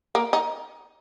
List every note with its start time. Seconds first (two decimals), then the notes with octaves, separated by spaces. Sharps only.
0.15 A#3
0.33 D#4